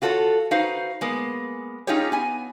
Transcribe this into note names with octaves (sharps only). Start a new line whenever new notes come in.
F4 F#4 A4 C5 C#5
D#4 F#4 B4 C5 F5
G#3 A#3 B3
C#4 D#4 F4 G4 G#4 C#5
B3 G#5